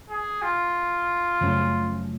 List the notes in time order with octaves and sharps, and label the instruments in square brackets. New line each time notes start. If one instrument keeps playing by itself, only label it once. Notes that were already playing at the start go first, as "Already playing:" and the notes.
[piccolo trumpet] G#4
F4
[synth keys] F#2 C#3 F3 A3 C#4